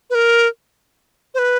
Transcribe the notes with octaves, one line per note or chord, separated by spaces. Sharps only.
B4
A#4
C5
B4